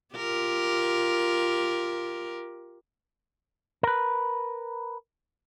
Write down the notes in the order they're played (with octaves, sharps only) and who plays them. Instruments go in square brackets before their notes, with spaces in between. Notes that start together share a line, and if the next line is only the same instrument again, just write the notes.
[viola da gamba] F4 G4 A#4
[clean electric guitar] A#4 B4